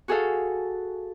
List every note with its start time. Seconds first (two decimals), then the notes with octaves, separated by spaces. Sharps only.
0.08 F#4 G#4 A4 F5